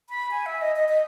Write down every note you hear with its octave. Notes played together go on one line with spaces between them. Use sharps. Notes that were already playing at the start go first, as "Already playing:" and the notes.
B5
G#5
E5
D#5
D#5
D#5